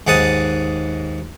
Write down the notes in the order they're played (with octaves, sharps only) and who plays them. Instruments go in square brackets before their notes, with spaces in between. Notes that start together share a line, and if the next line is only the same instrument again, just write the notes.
[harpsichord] D#2 G#2 G#4 F#5 A5 D#6